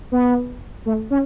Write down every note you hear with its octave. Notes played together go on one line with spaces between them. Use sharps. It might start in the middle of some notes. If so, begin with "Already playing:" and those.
B3
A3
C#4